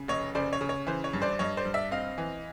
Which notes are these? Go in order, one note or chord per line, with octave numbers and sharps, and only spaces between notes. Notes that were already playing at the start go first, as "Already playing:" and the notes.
Already playing: C#3
F1 C#5 D#5
C#3 C5 D5
C#5
C#3
C#5
E3 C5
C#5
G2
C5 D5
G2 C#5 D#5
C5 D5
G2
D5 E5
C4 D#5 F5
E3